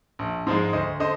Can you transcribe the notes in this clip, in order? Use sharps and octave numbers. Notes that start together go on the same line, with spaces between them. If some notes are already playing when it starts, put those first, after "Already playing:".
A#1
G#2 F3 G#3
D2 C5 D#5
D3 C5 D#5